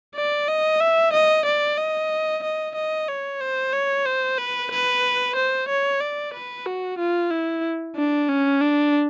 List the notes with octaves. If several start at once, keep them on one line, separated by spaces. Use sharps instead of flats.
D5
D#5
E5
D#5
D5
D#5
D#5
D#5
C#5
C5
C#5
C5
B4
B4
C5
C#5
D5
B4
F#4
F4
E4
D4
C#4
D4